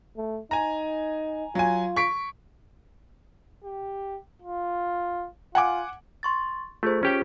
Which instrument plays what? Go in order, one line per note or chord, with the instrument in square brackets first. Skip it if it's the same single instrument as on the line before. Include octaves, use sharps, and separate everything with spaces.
[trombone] A3
[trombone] D#4 [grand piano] G#5 A#5
[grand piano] F#3 G#5 [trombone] F4
[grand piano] C#6 B6 D7
[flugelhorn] G4
F4
[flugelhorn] F4 [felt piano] F#5 G#5 D6
[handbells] C6 C#6 A6
[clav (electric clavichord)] A3 [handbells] F4 G#4 C5
[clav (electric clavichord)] C#4 G4 G5